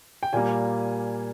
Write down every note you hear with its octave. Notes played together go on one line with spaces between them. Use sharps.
G5
A#2 G3 A#3 G#5